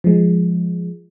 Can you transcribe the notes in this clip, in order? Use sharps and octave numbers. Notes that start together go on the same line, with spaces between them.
F3 G#3